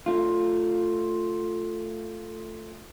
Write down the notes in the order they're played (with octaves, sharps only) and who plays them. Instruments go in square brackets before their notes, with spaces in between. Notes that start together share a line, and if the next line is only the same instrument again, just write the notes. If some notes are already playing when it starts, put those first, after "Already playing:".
[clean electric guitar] A3 F4